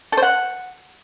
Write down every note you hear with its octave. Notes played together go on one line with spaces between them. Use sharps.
A4
C5
F#5